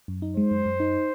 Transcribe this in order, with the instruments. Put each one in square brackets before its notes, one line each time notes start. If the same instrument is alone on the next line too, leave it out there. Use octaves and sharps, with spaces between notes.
[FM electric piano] F#2
D#4
[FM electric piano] G#3 [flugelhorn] C5
[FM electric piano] F#2
F#2
D#4